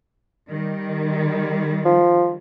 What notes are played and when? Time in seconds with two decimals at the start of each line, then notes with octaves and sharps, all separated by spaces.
0.48 D#3 G3
1.85 F3